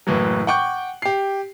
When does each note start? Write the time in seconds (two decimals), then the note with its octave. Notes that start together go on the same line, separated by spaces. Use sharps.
0.07 F#1 A2 E3 F#3
0.47 F#5 G5 C#6 D6 G6
1.02 G4 C7